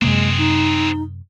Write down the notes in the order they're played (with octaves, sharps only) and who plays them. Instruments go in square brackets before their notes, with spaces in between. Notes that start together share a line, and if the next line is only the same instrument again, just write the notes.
[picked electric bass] F#2 C3 A#3 [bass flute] G#3 [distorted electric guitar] C4 G#4
[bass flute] D#4